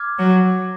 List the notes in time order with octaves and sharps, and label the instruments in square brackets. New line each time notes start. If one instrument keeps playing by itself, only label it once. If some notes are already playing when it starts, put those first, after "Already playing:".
Already playing: [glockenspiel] D6 F6 G#6
[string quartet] F#3